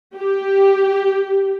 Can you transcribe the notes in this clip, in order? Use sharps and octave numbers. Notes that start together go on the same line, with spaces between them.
G4